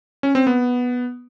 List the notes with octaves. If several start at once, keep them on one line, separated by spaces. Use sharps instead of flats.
C#4
C4
B3